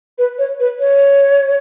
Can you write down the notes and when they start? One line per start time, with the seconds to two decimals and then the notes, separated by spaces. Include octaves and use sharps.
0.18 B4
0.38 C#5
0.60 B4
0.80 C#5